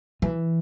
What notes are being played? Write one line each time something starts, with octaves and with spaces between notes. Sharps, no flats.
E3